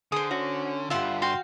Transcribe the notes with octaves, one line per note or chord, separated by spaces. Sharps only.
D3 G#4 C5 D#6
C#4 F#4
G2 D3 F4 G4 E5 F#5 C6
F#4 F5 G5 C6